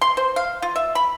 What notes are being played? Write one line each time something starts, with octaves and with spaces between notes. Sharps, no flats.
C6
C5
F5
F4
E5
B5